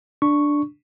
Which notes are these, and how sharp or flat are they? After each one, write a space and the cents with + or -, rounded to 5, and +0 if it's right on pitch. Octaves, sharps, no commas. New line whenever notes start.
D4 +0 C#6 +0